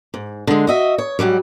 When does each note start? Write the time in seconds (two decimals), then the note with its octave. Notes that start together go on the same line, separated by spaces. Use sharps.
0.14 G#2
0.47 D3 G#3
0.67 F#4 D#5 E5
0.98 C#5
1.19 G#2 D#3 F#3 G3